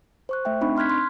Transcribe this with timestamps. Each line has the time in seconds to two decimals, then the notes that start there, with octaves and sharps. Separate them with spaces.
0.29 C5 C#6 F#6
0.45 A3 E5 G5
0.61 C4 D4 D#4 B5 C#6
0.77 C6 F6 F#6 G#6 B6
0.90 C6